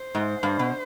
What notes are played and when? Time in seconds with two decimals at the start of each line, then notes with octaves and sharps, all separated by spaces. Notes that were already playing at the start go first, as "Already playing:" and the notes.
Already playing: C5
0.15 G#2
0.43 G2
0.59 B2